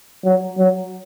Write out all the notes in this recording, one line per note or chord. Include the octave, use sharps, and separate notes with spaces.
F#3
F#3